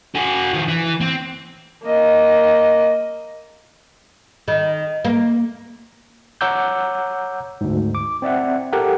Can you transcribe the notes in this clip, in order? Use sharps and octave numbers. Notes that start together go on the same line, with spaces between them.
F#4 G#4
D#3 F3
E3
C4
A#3 D#5
D#3
A#3
C#5 F#5 A#5 D6 E6 G6
D2 G#2
D6
C4 D5 E5 F#5
G4 A4 A#4 F#5